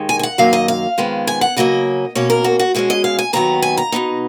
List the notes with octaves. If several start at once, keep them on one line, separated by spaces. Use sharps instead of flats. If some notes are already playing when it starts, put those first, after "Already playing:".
Already playing: D#2 D#3 G#3
G#5
G#5
F#5
F#2 D#3 F#3 A#3 F5
D#5
F5
F2 D#3 G#3 B3
G#5
F#5
C#3 F#3 A#3 C#4 D#5
B2 A#3 C#4 C#5
A#4
F#4
F#4
B2 G#3 C#4 F#4
D#5
F5
G#5
D#2 D#3 F#3 B3 A#5
G#5
A#5
B2 F#3 B3 D#4